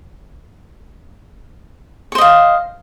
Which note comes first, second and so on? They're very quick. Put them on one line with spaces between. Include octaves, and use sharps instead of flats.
C#5 C5 D#5 F5